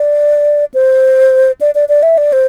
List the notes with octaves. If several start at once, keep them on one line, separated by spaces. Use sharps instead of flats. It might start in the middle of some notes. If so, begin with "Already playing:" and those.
Already playing: D5
C5
D5
D5
D5
E5
D5
C5